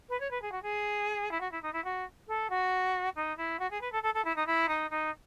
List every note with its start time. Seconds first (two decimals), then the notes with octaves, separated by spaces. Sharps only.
0.09 B4
0.20 C#5
0.31 B4
0.42 G#4
0.52 F#4
0.63 G#4
1.31 E4
1.41 F#4
1.52 E4
1.62 D#4
1.73 E4
1.84 F#4
2.28 A4
2.50 F#4
3.16 D#4
3.37 E4
3.59 F#4
3.71 G#4
3.81 B4
3.92 A4
4.03 A4
4.14 A4
4.25 E4
4.36 D#4
4.47 E4
4.68 D#4
4.90 D#4